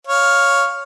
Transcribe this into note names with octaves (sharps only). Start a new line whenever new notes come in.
C#5 F5